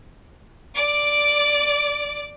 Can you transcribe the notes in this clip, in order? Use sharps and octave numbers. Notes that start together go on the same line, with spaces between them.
D5 D6